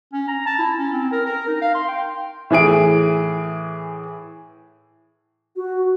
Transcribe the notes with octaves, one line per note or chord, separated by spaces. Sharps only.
C#4
A#5
A5
E4
C#4
C4
A#4
A#4
D#4
F5
C6
G5
A2 E3 G#4 D7
F#4